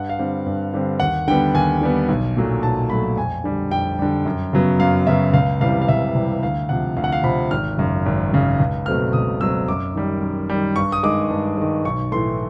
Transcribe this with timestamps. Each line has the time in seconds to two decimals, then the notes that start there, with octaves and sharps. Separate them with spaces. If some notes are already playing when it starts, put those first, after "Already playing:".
Already playing: G2 F#5
0.09 F5
0.19 D3 G3 C4
0.46 G2
0.74 D3 G3 C4
1.00 D#2 F#5
1.28 D3 G3 B3 G5
1.54 D#2 G#5
1.81 D3 G3 B3
2.08 B1
2.36 A#2 F#3 A3
2.63 B1 A5
2.89 A#2 F#3 A3 B5
3.17 F2 G#5
3.44 D3 G3
3.71 F2 G5
3.99 D3 G3
4.25 F#2
4.53 C#3 F#3 B3
4.79 F#2 F5
5.07 C#3 F#3 B3 E5
5.33 C#2 F5
5.60 C3 E3 G3 F5
5.81 F5
5.88 C#2 E5
6.15 C3 E3 G3
6.43 D2 F5
6.69 C3 F3 F#5
6.97 D2 F5
7.04 F#5
7.12 F5
7.23 C3 F3 B5
7.51 G#1 F6
7.78 F#2 C#3
8.06 G#1
8.33 F#2 C#3
8.59 C#2
8.86 B2 F#3 A3 C4 F6
9.13 C#2 D#6
9.41 B2 F#3 A3 C4 E6
9.68 F#2 D6
9.95 D#3 G3
10.21 F#2
10.50 D#3 G3
10.76 G2 C#6
10.92 D#6
11.03 D#3 G#3 D6
11.30 G2
11.57 D#3 G#3
11.85 B1 C#6
12.12 A2 E3 A3 C6